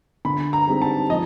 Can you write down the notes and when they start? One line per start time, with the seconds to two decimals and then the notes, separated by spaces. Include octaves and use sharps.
0.25 D3 B5
0.53 A#5
0.67 G3 C4 D#4 G#4
0.82 A5
1.10 F3 D#5